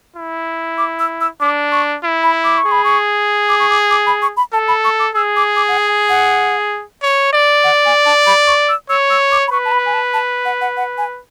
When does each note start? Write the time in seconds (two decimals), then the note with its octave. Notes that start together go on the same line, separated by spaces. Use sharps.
0.16 E4
0.78 D6
0.99 E6
1.21 E6
1.40 D4 D6
1.72 C#6
2.04 E4
2.23 B5
2.44 D6
2.58 C#6
2.66 G#4
2.72 B5
2.84 C#6
3.49 D6
3.60 C#6
3.70 D6
3.90 D6
4.07 B5
4.22 C#6
4.37 B5
4.53 A4 A5
4.68 B5
4.84 C#6
4.99 D6
5.15 G#4 E6
5.36 D6
5.56 D6
5.68 F#5
5.78 G#5
6.09 F#5
7.02 C#5
7.33 D5
7.64 F#5
7.85 G#5
8.06 A5
8.26 B5
8.47 C#6
8.69 E6
8.89 C#5 E6
9.10 E6
9.31 D6
9.48 B5
9.52 B4 C#6
9.65 A5
9.72 B5
9.86 G#5
9.94 A5
10.14 A5
10.45 F#5
10.61 F#5
10.77 F#5
10.98 G#5